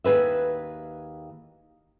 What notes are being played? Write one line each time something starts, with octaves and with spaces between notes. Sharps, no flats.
D#2 G#4 B4 E5